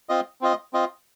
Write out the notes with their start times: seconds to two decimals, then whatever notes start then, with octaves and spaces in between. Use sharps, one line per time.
0.09 C4 F4 D#5
0.41 C4 F4 D#5
0.73 C4 F4 D#5